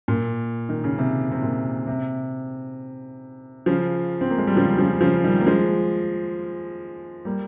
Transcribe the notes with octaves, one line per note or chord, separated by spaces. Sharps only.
A#2
D#3
C#3
C3
C3
A#2
C3
C#3 F3
C4
A#3
G#3
G3
C#3 F3
C#3 F3
C#3 F3
D#3 G3
A#3
F3 G#3
G3 A#3